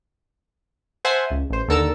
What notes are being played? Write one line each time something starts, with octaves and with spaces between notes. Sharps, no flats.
C5 E5 F#5 G#5 A5 C6
C#2
A1 C5
D#2 D3 A4 A#4 A5 E6